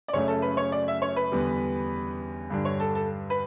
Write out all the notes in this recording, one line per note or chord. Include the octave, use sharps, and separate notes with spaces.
D5
F#2 C#3 F#3 A3 C#4 C#5
A4
B4
C#5
D5
E5
C#5
B4
E2 D3 G3 B3
G2 D3 G3 D4
C#5
A4
A4
B4